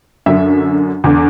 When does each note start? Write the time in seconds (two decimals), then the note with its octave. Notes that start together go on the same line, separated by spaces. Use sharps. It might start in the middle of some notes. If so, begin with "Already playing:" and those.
0.26 F#2 D3 E5
1.04 E2 D3